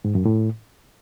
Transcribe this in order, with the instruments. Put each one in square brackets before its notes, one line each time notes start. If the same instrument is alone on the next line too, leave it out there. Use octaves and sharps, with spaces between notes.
[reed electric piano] G#2
F#2
A2